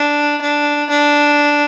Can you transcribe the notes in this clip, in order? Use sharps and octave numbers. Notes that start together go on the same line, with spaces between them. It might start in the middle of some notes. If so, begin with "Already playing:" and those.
Already playing: D4
D4
D4